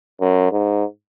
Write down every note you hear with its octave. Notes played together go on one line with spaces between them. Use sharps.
F#2
G#2